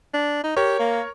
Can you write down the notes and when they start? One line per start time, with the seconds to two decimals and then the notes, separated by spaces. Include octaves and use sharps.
0.14 D4
0.44 D#4
0.56 G4 A#4 C#5 C#6
0.79 A#3